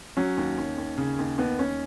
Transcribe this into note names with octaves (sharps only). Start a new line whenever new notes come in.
F#3 C#4
D#2
D#2
D#2
C#3
D#2
D#2 B3
D#2 C#4